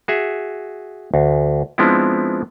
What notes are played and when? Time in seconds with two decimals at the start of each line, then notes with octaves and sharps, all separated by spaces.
0.08 F#4 G#4 E5
1.14 D2
1.78 F3 G#3 B3 C4 D4 E4